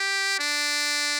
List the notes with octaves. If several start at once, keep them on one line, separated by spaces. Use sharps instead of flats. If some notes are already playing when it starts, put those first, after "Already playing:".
Already playing: G4
D4